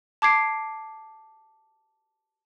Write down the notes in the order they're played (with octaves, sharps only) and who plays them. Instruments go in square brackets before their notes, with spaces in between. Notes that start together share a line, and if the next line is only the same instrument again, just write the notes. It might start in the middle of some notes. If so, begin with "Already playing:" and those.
[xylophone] A5 D6 G#6 C7 D7